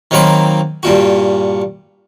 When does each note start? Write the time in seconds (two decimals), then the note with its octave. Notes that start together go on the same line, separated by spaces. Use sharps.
0.11 D#3 F#3 A#3 C4 B5
0.83 G2 A#2 F#4